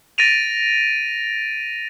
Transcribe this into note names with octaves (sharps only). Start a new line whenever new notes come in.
A6 A#6 D7 D#7 F7